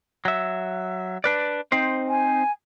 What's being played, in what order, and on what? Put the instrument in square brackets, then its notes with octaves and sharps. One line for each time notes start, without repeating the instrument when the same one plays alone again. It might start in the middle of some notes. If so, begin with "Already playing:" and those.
[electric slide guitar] F#3 E5
D4 B4 D5
C4 D#4 C5
[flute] G#5